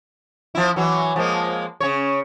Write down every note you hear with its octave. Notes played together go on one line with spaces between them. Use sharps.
F3 E4
E3 F#3
F3 G#3 A#3
C#3 C#5